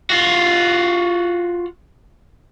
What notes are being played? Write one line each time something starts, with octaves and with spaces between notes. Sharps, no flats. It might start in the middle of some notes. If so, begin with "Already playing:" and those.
F4 F#4